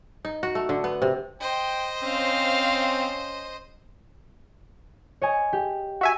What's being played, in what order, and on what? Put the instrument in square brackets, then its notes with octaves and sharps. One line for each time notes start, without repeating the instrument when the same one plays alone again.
[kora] D#4
F#4
A3
D3
B3
C3
[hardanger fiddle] C5 D#5 [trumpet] G5
[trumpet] C4 [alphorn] C#4 [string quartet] F5
[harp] C#5 D#5 G#5
G4
[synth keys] F#4 E5 G#5